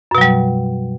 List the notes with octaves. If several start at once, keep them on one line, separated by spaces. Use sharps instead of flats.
F#2 B2 F#3 G3